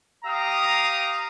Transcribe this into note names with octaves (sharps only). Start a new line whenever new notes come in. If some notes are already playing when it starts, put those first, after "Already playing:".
G4 F5 A#5 D#6